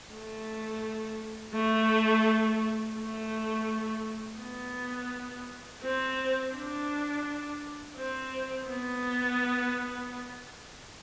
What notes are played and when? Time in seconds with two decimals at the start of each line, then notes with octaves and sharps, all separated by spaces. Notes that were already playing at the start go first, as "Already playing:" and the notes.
0.11 A3
1.53 A3
2.97 A3
4.39 B3
5.82 C4
6.53 D4
7.97 C4
8.67 B3